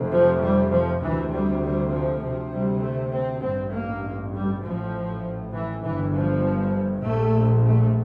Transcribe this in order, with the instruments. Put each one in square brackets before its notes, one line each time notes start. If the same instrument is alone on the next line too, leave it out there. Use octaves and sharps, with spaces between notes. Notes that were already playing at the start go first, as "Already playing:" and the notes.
Already playing: [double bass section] F1 F2 C3
F3
G3
F3
D2 C3 E3
G3
G3
F3
D2 C3
G3
A3
C4
A1 G2 C4
A#3
G3
A1 A2 F3
E3
G1 G2 E3
F3
A#1 A#2 A3
A3